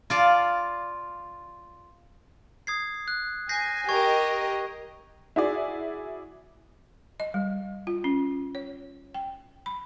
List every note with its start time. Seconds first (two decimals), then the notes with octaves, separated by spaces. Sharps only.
0.10 F4 D5 A5
2.67 D#6 G#6 C7
3.08 F#6
3.49 G#5 G6 A#6 C7
3.89 G4 A#4 D#5 C#6 G#6
5.36 E4 F#4 G#4 D5
7.20 D#5
7.34 G3
7.87 F4
8.04 C#4
8.55 C#5
9.14 G5
9.66 B5